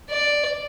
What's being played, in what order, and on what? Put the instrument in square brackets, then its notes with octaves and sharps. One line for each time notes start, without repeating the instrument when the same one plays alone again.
[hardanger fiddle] D5